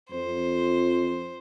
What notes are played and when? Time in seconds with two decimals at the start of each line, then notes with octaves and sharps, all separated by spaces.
0.11 F2 C5